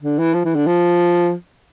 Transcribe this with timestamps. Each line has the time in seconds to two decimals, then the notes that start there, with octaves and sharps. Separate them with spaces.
0.02 D3
0.19 E3
0.34 F3
0.45 E3
0.55 D3
0.66 F3